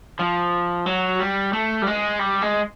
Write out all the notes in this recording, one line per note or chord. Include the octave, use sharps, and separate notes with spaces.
F3
F#3
G3
A3
G3
G#3
G3
G#3